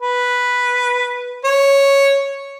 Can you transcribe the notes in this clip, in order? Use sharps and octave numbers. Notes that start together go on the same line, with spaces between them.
B4
C#5